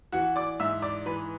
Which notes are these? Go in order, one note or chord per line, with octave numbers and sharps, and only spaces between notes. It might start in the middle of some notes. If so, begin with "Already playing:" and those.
E3 F#4 F#5
D5 D6
G#2 E5 E6
D5 D6
E3 B4 B5